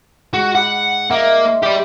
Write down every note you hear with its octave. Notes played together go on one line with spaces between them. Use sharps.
G#2 F#4
F#5 B5 D6 F6
A#3 D#5 E5 C#6
C6
G4 D5